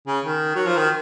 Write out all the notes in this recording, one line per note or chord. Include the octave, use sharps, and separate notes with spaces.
C#3
D#3
F#3
F3
D#3